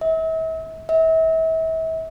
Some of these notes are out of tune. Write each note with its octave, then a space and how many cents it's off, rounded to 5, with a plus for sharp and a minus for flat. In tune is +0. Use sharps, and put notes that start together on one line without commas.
E5 -40
E5 -35